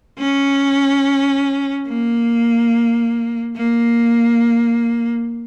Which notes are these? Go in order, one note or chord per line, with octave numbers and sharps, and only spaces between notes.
C#4
A#3
A#3